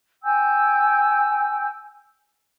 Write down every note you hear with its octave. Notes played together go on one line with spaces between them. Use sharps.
G5 G#5 E6 G6